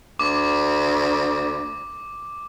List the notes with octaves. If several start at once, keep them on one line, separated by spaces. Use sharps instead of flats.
D2 D6